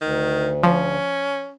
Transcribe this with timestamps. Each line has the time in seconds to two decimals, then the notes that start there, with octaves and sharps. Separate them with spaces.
0.01 D2 D#3
0.63 F3 C#4